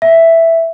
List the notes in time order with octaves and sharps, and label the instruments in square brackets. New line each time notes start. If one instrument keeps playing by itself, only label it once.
[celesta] E5